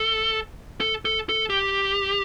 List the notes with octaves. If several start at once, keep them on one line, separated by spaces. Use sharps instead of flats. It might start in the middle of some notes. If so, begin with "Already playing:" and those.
Already playing: A4
A4
A4
A4
G4